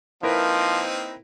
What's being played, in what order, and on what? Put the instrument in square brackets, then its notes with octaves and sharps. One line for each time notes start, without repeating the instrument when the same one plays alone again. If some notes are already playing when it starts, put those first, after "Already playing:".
[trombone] F3 [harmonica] A#3 C4 D#4 [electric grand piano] E4 A#4 B4